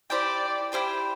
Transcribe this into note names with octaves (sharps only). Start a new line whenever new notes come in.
E4 G4 C5 D5 G5
E4 G4 C5 G5